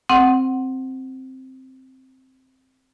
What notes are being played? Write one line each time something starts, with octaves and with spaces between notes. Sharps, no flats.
C4 F#5